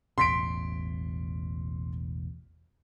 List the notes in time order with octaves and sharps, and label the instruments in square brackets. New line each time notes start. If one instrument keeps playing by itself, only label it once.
[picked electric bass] E1 A1 B2 [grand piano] C6 B6 D7